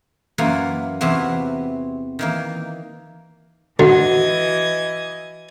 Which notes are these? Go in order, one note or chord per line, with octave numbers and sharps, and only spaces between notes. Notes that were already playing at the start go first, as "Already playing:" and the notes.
F#2 E3 A#3 F4 F#5
E2 C3 E3 B3 C4 F#4
D#3 E3 A#3
D3 E3 F#4 D#5 F#5 G#6